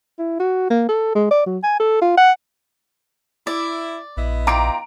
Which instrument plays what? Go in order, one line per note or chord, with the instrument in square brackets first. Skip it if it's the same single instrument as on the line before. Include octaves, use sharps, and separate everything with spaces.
[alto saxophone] E4
F#4
A#3
A4
G#3
D5
F#3
G#5
A4
F4
F#5
[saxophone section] E4 [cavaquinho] D5
[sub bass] A#1 [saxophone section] B3 E4 D#5
[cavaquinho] F4 G5 [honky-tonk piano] A#5 D6 D7